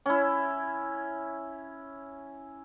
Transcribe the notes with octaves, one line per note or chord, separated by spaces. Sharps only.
C#4 E4